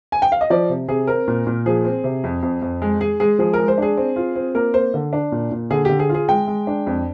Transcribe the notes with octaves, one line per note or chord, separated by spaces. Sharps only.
G#5
G5
F5
D#5
F3 D5
C3
C3 G#4
C4 A#4
A#2
A#2
F3 G#4
C4
C3
F2
F2
F2
G#3
G#3 G#4
G#3 G#4
F3 G#4
A#4
G#3
C5
D4 G#4
C4
F4
C4
A#3 A#4
A#3 C5
D3
D4
A#2
A#2
D3 G#4
D3 G4
G#4
F4
G#4
G#3 G5
G#3
D4
F2